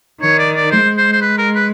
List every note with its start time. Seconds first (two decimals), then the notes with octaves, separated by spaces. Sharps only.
0.22 D#3 C#5
0.38 D5
0.56 D5
0.71 G#3 C5
0.97 C5
1.13 C5
1.22 B4
1.38 A#4
1.55 B4